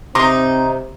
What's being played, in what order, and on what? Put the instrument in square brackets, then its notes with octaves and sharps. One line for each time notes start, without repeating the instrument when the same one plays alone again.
[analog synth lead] C3 [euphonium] C4 [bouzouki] D#4 [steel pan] A#5 C6 D6